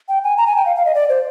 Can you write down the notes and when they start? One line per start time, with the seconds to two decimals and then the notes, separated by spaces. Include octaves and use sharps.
0.09 G5
0.24 G#5
0.38 A#5
0.47 G#5
0.56 G5
0.66 F5
0.76 F5
0.85 D#5
0.95 D5
1.09 C5